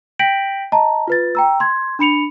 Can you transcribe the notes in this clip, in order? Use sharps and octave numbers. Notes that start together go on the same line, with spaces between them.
G5 G6 A#6 B6 D7 F#7
D#5 A5 A#5
F4 B4 A6
G5 A#5 E6
C6 G#6
D4 B5 C#7 F7